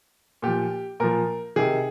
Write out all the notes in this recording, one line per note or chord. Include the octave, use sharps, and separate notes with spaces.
A#2 F3 G4
A#2 F3 A#4
C3 D#3 G#4